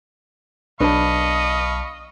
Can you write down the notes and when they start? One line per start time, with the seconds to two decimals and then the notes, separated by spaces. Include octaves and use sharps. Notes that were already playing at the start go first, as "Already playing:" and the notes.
0.80 B1 D4 B4 D#5 F5 A5 B5 C#6